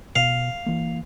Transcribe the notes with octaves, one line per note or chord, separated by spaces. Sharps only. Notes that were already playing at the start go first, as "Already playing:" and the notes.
B2 F5
E3 A#3